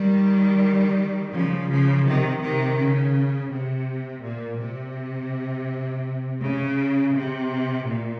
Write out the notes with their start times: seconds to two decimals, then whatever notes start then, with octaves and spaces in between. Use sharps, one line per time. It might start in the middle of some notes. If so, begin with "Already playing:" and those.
Already playing: D#3 G3
1.33 C#3 F3
1.69 C#3 F3
2.05 C3 D#3
2.42 C3 D#3
2.77 C#3
3.51 C3
4.23 A#2
4.59 C3
6.41 C#3
7.14 C3
7.86 A#2